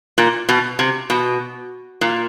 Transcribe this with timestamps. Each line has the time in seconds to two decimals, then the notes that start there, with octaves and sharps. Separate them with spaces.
0.18 A#2
0.49 B2
0.79 C3
1.10 B2
2.01 A#2